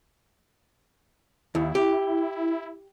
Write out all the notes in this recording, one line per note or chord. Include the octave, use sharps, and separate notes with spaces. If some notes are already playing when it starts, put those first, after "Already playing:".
D#2 E4
G4